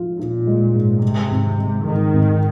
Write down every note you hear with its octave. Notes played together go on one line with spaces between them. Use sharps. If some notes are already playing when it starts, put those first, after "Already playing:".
Already playing: F3 F4
A#2 F4
G#3
G#2
C3 G#3
G#1
G#3
G#2 D#3
G#1